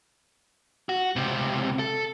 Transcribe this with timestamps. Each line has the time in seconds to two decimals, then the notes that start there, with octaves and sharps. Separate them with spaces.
0.89 F#4
1.16 C#2 C3
1.79 A4